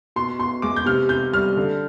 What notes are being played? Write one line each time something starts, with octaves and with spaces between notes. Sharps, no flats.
B2 C6
B2 C6
G#3 D6
G6
C3 F6
C3 G6
G3 F6
D3